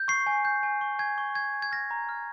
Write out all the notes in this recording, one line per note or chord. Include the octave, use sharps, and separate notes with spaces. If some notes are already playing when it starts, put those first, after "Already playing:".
Already playing: G6
C#6 C7
G#5
G6
G#5
C#6
G#5 G#6
C#6
G#5 G#6
G#5
G#6
F6 A#6
A#5
F6